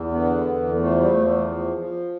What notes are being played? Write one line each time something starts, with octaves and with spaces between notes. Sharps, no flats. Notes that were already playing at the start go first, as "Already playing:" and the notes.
Already playing: E2
D3 B3
E2
F3 A3
G3
E2 A3
A3
F3
F3